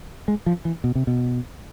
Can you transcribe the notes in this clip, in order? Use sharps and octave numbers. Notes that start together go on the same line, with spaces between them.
G#3
F3
E3
B2
C3
B2